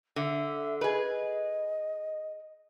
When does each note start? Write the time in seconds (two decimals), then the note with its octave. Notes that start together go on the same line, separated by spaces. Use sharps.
0.16 D3 E5
0.81 G#4 B4 D#5